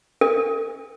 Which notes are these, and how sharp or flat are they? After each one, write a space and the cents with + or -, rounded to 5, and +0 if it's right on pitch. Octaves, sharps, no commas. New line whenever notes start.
A#4 -45